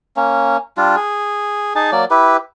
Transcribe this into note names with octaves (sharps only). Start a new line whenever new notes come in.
A#3 C#4
G3 D4 F4
G#4
D#4 G#4 A5
F#3 A#3 D5
E4 G4 B4